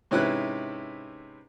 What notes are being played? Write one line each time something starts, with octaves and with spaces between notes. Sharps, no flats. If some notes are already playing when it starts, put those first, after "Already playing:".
G#2 C3 C#4 E4 B4 F#6